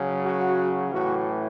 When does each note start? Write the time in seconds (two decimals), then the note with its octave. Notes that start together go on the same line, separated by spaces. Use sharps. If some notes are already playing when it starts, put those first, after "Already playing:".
Already playing: C#3 F#3
0.25 F#4
0.91 A2 E3 F#4